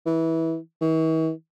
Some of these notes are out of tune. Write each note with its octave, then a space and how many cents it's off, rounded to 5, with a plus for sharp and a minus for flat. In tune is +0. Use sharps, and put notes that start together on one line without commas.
E3 -20
E3 -45